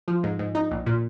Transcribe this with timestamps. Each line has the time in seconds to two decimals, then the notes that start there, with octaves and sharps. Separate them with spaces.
0.08 F3
0.23 G#2
0.39 G#2
0.55 D#4
0.71 A#1
0.86 A#2